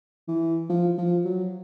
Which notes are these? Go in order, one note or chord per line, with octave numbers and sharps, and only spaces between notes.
E3
F3
F3
F#3